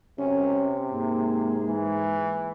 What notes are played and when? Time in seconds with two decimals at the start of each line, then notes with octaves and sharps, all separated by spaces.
0.19 C3 C#4
0.92 G#2 G#3 A#3
1.66 E3